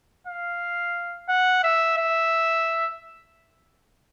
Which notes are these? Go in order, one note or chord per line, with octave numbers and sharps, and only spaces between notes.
F5
F#5
E5
E5